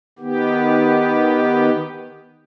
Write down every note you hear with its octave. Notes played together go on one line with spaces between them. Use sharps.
D#3 B3 G4